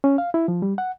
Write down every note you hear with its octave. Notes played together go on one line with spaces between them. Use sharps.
C#4
F5
E4
F3
G3
F#5